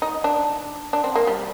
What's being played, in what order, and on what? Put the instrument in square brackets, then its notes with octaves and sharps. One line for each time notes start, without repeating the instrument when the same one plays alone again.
[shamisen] D#4
D4
D4
C4
A#3
G3